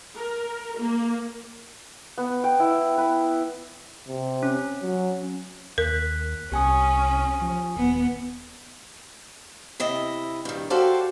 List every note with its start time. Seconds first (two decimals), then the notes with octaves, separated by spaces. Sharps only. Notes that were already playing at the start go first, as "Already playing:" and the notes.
0.16 A#4
0.80 A#3
2.18 B3
2.44 G5
2.60 E4
2.98 B4
4.08 C3
4.43 C#4
4.82 F#3
5.78 D#2 A#4 F#6 B6
6.52 C2 C#4 G4 G#5 D#6
7.42 F3
7.76 D#1 B3
9.80 C3 E4 D#5
10.45 G2 D#3
10.70 F#4 G4 A4 C5 D5 F5